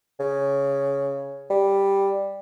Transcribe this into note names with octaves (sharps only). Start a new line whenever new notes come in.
C#3
G3